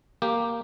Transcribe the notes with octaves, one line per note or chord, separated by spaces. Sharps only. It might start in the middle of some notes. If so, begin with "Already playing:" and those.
A#3 G4